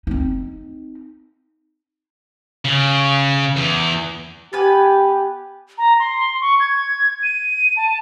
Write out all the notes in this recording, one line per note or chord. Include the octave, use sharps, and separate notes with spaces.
C4 D#4
C#3
E2
B3 G4 B4 G#5
A#5
C6
C#6
G#6
D#7
A5